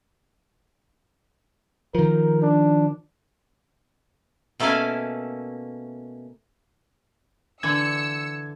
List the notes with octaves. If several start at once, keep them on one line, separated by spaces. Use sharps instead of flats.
D#3 F3 A#4
D4
B2 A3 A#3 C#4 E4 G#5
D3 E3 E6 G#6 C#7